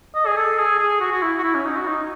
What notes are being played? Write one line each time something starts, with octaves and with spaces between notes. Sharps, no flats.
D#5
G#4
A4
G#4
G#4
F#4
F#4
E4
F#4
E4
C#4
D#4
F#4
D#4